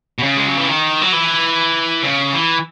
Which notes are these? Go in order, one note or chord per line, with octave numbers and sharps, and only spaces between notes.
B2
C#3
G#3
F#3
E3
D#3
F#3
E3
C#3
E3